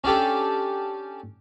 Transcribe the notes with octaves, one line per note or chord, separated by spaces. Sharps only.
C#4 D4 G4 A4